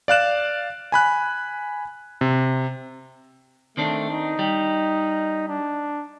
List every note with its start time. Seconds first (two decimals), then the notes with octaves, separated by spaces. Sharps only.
0.08 D5 F5 F#6 E7
0.92 G#5 B5 F#6
2.21 C3
3.77 D#3 A3 C4 D4
4.10 D#4
4.39 G3
5.48 D4